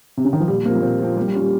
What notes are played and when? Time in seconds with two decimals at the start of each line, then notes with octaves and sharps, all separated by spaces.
0.17 C3
0.25 C#3
0.33 D#3
0.40 F3
0.48 A#2 G3
0.65 F3 A#3 C4 F4
0.76 A#3
0.82 A#2 C4
1.00 F3 C4 F4
1.17 G3 A#3
1.28 G3
1.34 C#4 F4
1.40 G3